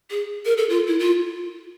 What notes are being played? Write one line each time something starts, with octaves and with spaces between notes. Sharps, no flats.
G#4
A#4
A4
F4
E4
F4